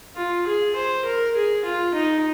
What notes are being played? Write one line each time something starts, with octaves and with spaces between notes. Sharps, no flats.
F4
G#4
C5
A#4
G#4
F4
D#4